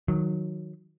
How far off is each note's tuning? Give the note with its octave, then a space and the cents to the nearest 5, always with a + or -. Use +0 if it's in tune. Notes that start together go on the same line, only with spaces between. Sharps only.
D#3 +10 F#3 -10